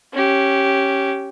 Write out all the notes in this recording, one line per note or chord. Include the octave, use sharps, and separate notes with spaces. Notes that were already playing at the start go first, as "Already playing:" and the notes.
C#4 G4